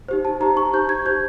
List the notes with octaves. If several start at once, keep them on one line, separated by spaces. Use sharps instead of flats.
D#4 G4 C5
A5
D#4 G4 C5 A#5
C#6
D#4 G4 C5 G6
G#6
D#4 G4 C5 G6